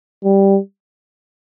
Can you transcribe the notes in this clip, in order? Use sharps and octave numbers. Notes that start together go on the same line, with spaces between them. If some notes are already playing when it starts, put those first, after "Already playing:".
G3